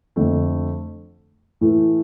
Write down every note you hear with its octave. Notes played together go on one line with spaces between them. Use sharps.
F2 D3 A3
A2 E3 A3